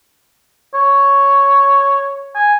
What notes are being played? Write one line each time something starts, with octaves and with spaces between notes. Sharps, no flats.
C#5
G#5